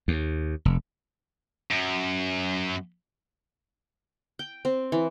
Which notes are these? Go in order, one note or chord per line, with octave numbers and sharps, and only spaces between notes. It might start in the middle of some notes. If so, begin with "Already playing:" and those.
D#2
F1
F#2
G5
C4
E3